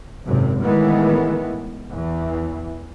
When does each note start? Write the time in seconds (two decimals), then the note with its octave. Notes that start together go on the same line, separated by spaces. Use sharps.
0.25 G#1 F#2 C3
0.64 A2 D#3 E3 G#3 B3
1.92 E2 E3